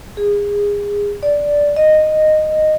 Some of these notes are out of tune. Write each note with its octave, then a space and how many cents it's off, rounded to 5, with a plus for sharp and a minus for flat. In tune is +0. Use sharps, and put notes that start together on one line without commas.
G#4 -25
D5 -5
D#5 -10